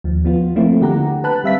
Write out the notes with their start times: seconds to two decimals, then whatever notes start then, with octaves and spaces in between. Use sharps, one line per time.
0.04 D#2 F3
0.25 F3 B3 F4
0.56 F3 A3 A#3 C4 E4
0.82 D3 G4 F#5 A#5
1.24 B4 A5 B5 F#6
1.44 G3 C4 E5 F5 B6